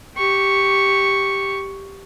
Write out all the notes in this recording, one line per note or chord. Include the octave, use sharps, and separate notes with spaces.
G4 C#6